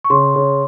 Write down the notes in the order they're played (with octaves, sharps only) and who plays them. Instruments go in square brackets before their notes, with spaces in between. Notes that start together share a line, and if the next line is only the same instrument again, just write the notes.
[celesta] C#6
[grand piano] C#3 [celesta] C6
[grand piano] C#3